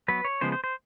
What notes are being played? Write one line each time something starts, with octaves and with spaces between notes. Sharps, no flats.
F#3 B3 B4
C#5
C#3 F3 G#3 B3 C5
C5
C5